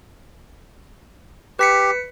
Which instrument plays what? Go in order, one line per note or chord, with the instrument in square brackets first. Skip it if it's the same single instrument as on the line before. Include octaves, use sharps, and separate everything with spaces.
[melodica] G4 [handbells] B4 B6 C#7